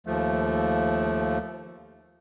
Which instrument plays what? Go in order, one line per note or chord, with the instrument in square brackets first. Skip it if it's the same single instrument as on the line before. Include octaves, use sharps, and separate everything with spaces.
[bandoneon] D#2 F3 A3